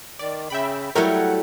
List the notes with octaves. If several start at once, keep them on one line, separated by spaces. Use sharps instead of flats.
D#3 D5
C#3 E5 G5 B5
F#3 G3 A3 E4 A#4 C#5 F#5 G5